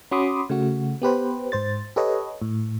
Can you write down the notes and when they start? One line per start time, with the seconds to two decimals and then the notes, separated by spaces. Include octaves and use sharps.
0.11 C#4 F#4 B5 C6 D6 D#6
0.50 C#3 A3 F#4
1.02 B3 G4 B4 C5
1.52 G#2 C5 A6
1.96 G4 A4 B4 C#5 D#5
2.42 A2